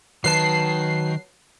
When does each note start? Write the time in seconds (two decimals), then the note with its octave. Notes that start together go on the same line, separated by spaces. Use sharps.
0.24 D#3 F#3 B4 A5 C7